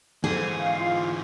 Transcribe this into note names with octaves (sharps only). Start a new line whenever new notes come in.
G#2 E3 G#4
F5
F4